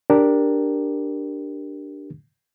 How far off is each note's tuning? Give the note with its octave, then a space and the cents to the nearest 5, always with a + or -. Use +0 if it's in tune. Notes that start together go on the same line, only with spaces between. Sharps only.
D4 +0 G4 +0 A#4 +0